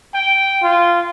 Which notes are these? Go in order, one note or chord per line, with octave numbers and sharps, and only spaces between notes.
G5
F4